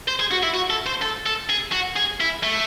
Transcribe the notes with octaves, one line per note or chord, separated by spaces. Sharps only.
C5
G#4
F#4
E4
F#4
A4
C5
A4
A4
G#4
F#4
G#4
E4
A3